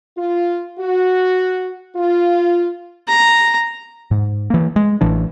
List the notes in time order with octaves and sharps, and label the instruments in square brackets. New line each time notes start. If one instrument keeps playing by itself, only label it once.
[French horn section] F4
F#4
F4
[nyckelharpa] A#5
[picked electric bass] G#2
E3 A#3
G#3
A1 E3 D4